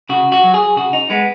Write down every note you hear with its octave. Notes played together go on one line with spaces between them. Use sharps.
C#3 F#4
F#4
F#3
G#4
C#3 F#4
D#4
G#3 B3